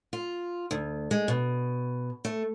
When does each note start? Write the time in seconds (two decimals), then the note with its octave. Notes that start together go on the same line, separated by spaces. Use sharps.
0.13 F4
0.71 D2
1.11 G#3
1.28 B2
2.25 A3